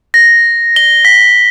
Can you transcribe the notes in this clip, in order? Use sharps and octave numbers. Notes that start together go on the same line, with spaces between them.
A#6
G7
B6